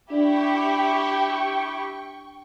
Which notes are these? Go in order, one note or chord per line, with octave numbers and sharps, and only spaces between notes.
D4 E4 G4 D5 G5 C#6